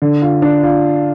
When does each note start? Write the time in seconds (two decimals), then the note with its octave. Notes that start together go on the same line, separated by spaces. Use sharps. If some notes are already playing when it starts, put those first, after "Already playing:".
0.02 D3
0.22 F4
0.42 D4
0.63 F4